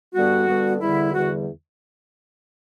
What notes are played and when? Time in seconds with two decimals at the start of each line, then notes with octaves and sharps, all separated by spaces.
0.14 G2 D3 G3 B3 F#4
0.47 G2 D3 G3 B3
0.81 E2 D3 G3 E4
1.14 E2 D3 G3 F#4